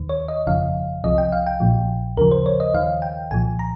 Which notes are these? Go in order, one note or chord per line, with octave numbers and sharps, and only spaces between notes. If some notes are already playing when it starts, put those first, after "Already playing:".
Already playing: D#2 D#3
C#5
D#5
G1 F2 C#3 F3 F5
C2 C3 F3 D#5
G5
F5
G5
A#1 A#2 F3
D#2 C#3 F3 A#4
C5
C#5
D#5
D#2 D#3 F5
G5
C2 A#2 F3 G#5
A#5